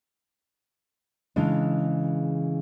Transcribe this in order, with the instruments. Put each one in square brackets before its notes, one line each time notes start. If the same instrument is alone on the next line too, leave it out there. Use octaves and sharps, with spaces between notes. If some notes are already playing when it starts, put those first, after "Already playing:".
[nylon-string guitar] C#3 E3 G#3 D4